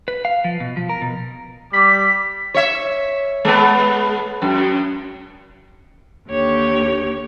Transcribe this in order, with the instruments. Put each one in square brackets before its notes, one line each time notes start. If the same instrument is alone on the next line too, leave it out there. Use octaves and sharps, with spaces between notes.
[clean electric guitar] B4
F5
F3
B2
F3
A#4
B2
[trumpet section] G3 D6 [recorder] B6
[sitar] C#5 E5
G#3 B3
F#2
[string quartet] D#2 D3 G4 C#5